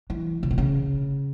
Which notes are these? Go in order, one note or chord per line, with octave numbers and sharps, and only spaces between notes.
E3
C#3
B2
C#3